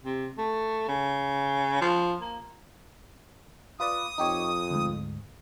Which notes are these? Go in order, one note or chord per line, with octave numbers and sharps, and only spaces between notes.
C3
A3
C#3
F3
A#3
F4 B4 D5 D#6
F2 D#4 G4 C#5
D2 G#2